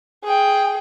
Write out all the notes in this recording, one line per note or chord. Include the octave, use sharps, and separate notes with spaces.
G#4 G5